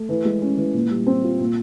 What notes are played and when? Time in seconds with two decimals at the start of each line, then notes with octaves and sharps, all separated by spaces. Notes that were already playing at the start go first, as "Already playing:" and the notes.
Already playing: A3
0.09 E3
0.25 G#3
0.42 C#4
0.58 E3
0.74 A#2
0.91 G3
1.07 C4
1.24 F4
1.40 A#2